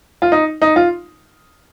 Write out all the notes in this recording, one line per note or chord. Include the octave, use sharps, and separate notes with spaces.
F4
D#4
D#4
F4